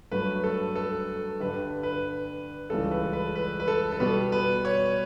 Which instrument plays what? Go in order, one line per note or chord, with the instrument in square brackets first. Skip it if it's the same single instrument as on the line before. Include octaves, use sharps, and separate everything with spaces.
[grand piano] G2 F#3 A3 B4
A4
A4
G2 D3 G3 B4
B4
C#2 C#3 E3 G3 A4
B4
B4
B4
B4
A4
A4
B2 G3 B3 B4
B4
C#5